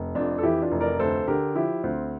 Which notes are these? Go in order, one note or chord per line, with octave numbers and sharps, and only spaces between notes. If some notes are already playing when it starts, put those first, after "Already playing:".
Already playing: F1
F2 D4 F4
A4
E3 E4 G4
D4 F4
F1
A#4 D5
D2 A4 C5
D3 G4 A#4
F3 E4 G4
D2 C4